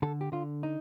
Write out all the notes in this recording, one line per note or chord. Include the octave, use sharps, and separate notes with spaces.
D3 A4
G4
D3 F4
D#4